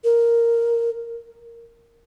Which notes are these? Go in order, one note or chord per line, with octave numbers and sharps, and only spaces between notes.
A#4